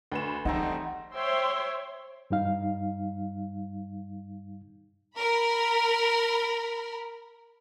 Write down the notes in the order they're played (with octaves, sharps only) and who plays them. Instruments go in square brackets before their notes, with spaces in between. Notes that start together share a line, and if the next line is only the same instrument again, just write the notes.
[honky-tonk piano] D2 B4 E7
[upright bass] E3 [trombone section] G3 A3 C4 [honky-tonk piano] D#4 [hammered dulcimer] F#5 G#5 A#5
[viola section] C5 C#5 E5 G5 C6
[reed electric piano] G2 G3 D#4 F5
[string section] A#4 B5